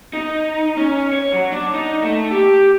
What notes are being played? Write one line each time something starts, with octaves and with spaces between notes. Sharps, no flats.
D#4
C#4
C#5
F#3
D4
D#4
A3
G4